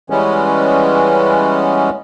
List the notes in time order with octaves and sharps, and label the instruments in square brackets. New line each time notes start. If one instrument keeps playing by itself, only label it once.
[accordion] E3 G3 G#3 B3 C#4